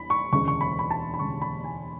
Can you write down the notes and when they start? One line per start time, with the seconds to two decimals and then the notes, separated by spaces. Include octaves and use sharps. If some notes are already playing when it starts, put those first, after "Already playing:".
Already playing: E2 D4 B5
0.10 C#6
0.32 E1 D2 C#3 G#3 C#6
0.48 C#6
0.61 B5
0.79 B5
0.91 A5
1.14 B5
1.19 E1 D2 C#3 G#3 C#6
1.42 B5
1.64 G#5